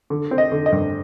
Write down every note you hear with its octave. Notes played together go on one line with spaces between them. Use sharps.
D3
C4
D#5
D3
D#5
G2